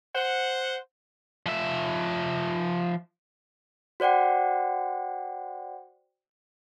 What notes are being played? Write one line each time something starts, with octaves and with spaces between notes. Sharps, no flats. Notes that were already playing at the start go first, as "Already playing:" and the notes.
C5 F#5
F3 E5
F#4 C5 D5 F#5 G5